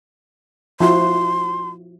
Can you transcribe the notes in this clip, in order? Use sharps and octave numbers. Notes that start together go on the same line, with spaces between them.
F3 E4 F#4 C6